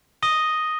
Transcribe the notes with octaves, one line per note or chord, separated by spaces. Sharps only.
D#6 A#6 D#7 G7